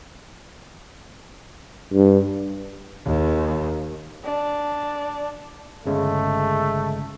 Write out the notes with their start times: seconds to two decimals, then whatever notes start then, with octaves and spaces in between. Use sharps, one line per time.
1.94 G2
3.05 D#2
4.25 D4
5.86 G1 C#3 G#3 A3